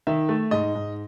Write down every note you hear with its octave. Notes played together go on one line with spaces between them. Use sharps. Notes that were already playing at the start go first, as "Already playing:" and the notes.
D#3 E5
A3
G#2 D#5
G#2